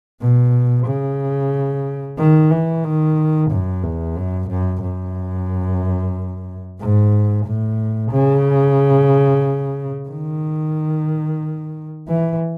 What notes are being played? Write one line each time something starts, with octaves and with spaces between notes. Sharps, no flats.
B2
C#3
D#3
E3
D#3
F#2
E2
F#2
F#2
F#2
G#2
A2
C#3
D#3
E3